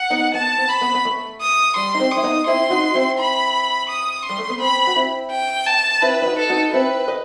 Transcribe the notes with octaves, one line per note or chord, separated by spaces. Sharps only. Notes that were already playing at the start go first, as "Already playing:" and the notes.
Already playing: F#5
B3 D#4
B3 A5
C4
B5
B3
B3
A3
D#6
G3 C6
D#4
C4
D#6
E4
B3 D#4
C4 E4 C6
D#4 F#4
C4 E4
B5
D#6
G3 C6
A3
B3
C4 B5
F#4
C4 E4
G5
A5
C4 E4 B4
E4
D#4 F#4
A4
D#4 F#4
C4 E4 B4
B4 D#5